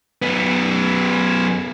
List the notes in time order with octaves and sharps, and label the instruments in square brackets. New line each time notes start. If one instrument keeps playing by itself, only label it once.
[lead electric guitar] F#2 B3